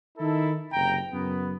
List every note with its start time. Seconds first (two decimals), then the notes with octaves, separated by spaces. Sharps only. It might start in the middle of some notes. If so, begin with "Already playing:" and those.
0.18 D#3 D#4 E4 A4
0.72 F#1 C3 G5 A#5
1.12 F#2 C#3 B3